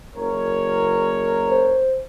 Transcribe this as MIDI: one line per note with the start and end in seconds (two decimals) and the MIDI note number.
0.15 1.83 30
0.15 1.83 70
0.15 1.83 73
1.49 2.01 72